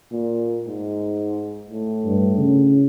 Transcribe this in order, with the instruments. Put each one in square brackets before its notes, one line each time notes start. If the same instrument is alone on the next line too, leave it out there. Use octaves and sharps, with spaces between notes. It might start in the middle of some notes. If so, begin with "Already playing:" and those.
[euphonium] A#2
G#2
A2
[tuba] G2
C#3